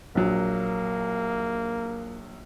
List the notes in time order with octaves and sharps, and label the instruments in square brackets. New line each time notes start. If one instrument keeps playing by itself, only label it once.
[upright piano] A#1 F#3 [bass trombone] A#3